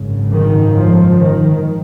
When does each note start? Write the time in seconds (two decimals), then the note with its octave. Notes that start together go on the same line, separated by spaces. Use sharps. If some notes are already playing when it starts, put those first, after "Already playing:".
Already playing: G#1 F#2 C#3
0.32 D#3
0.75 F3
1.18 D#3